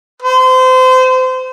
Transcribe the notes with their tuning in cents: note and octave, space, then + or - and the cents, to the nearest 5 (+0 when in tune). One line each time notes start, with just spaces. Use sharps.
C5 -30